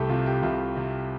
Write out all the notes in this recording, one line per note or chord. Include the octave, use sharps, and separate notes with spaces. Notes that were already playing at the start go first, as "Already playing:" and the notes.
Already playing: C2 A3 G4 A4
C3 F4
G4
C2 F4
C3